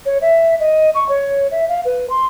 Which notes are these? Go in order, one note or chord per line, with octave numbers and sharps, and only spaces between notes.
C#5
E5
D#5
C#6
C#5
E5
F5
B4
C6